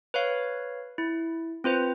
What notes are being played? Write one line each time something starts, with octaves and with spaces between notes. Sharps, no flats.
B4 C#5 F5
E4
C4 F4 B4 C5